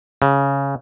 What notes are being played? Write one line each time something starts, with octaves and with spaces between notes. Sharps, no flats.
C#3